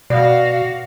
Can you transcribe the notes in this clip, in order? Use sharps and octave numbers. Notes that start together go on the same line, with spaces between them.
B2 F#4 D5 F5